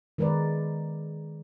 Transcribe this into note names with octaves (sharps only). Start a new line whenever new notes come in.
D#3 G#3 A#4 B4 D5